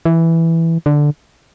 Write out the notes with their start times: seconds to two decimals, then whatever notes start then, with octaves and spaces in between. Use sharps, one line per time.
0.05 E3
0.86 D3